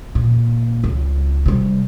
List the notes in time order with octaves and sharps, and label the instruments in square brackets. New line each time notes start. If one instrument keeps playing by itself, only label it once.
[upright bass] A#2
C#2
C3 G3